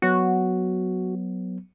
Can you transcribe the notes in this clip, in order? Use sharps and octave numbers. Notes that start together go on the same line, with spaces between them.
F#3 B3 F#4